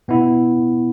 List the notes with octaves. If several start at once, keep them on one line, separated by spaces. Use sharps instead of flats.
B2 B3 E4